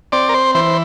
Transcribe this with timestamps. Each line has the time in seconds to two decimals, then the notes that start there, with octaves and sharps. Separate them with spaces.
0.12 C4 D5
0.29 A#4
0.34 C5
0.55 E3 C5